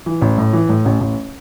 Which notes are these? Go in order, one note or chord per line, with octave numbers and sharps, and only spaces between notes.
E3
A1
A2
E3
A2
A1
A1